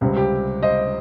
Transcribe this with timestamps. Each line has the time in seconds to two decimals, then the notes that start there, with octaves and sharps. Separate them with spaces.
0.01 C#2 C3 G3 C4
0.17 G4
0.63 C5 D#5